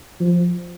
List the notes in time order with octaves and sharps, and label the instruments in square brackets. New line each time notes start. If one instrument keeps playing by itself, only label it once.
[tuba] F3